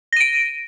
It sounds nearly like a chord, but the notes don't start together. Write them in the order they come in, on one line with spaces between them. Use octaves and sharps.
A#6 D#7 D7